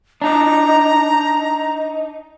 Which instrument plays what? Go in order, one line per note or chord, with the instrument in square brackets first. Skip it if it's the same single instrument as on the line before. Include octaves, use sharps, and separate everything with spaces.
[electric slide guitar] D4 D#4 [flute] A#5